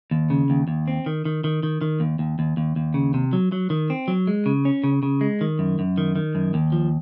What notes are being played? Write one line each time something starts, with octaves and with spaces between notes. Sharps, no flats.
D#2
C#3
D#2
D#2
C4
D#3
D#3
D#3
D#3
D#3
D#2
D#2
D#2
D#2
D#2
C#3
C3
F#3
F#3
D#3
C4
F#3
G#3
C#3
C#4
C#3
C#3
G#3
D#3
F#2
F#2
D#3
D#3
F#2
D#2
F3